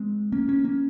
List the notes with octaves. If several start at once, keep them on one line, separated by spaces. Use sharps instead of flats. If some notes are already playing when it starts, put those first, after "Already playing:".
Already playing: G#3 C4
A#3 C#4
A#3 C#4
A#3 C#4